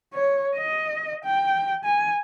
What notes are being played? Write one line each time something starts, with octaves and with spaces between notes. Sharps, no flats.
C#5
D#5
G5
G#5